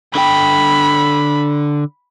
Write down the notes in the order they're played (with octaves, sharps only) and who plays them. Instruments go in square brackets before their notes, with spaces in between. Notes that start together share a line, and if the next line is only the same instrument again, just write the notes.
[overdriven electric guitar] D3 G5 [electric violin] B5